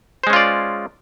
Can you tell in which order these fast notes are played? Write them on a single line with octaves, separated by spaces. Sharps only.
C5 G#3 C#4 F4 D5